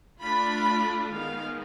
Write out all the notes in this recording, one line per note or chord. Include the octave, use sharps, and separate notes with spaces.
A3 D4 F4 B5
D#3 G#3 B3 F5